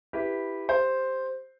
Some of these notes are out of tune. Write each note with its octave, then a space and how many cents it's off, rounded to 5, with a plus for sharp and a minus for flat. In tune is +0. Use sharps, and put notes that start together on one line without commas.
E4 +0 G4 +0 B4 +0
G4 +0 C5 +0